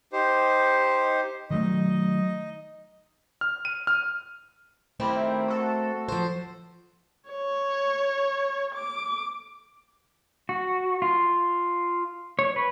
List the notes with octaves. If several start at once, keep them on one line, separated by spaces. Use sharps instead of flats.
D#4 G4 C5
D#3 F#3 A3 D#4 D#5
F6
D#7
F6
D#3 A3 C4 E4 G4 A#4
F#4 A4
F3 C5
C#5
D6
F#4
F4
C#5
B4